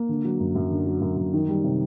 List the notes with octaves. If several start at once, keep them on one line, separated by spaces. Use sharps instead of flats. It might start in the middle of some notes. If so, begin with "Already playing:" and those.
Already playing: A#3
D3
F#3
F#2
F#2
D3
F#3
F#2
F#2
D#3
G3
C3